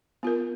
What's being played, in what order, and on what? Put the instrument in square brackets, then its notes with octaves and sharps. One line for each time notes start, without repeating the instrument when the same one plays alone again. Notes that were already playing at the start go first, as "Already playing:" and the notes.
[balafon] B3 F4 A#4